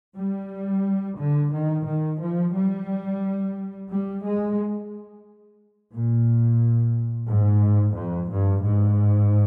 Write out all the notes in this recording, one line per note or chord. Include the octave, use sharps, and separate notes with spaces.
G3
D3
D#3
D#3
F3
G3
G3
G#3
A#2
G#2
F2
G2
G#2